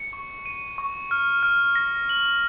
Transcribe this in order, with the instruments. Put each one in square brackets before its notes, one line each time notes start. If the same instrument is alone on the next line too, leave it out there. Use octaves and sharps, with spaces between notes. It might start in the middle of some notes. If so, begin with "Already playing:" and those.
Already playing: [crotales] C#7
C#6
D#7
C#6
F6
F6
A#6
F#7